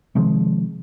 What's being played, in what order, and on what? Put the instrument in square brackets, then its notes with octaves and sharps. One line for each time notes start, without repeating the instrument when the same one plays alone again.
[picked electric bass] C3 D#3 F3 G#3